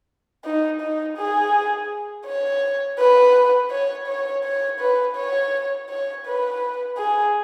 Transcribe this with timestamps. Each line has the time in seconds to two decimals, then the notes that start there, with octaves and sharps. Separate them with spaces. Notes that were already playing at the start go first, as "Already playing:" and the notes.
0.45 D#4
0.81 D#4
1.17 G#4
2.26 C#5
2.98 B4
3.71 C#5
4.07 C#5
4.44 C#5
4.80 B4
5.16 C#5
5.89 C#5
6.26 B4
6.98 G#4